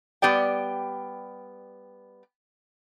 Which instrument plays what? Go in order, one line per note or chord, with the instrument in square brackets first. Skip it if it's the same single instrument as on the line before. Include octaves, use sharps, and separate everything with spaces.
[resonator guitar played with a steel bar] G3 B3 G4 D5 G5